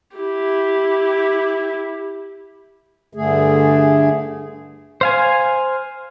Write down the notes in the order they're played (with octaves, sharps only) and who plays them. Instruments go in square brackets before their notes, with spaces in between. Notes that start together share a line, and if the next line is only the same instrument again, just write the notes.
[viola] E4 G4
[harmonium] G2 D3 A3 G#4
[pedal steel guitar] C5 F5 G#5